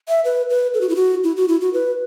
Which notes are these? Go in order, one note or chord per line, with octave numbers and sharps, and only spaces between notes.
E5
B4
B4
A4
F#4
E4
F#4
E4
F#4
E4
F#4
B4